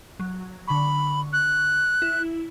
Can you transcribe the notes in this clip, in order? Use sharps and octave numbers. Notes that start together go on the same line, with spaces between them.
F#3
D3 B5 C#6
F#6
E4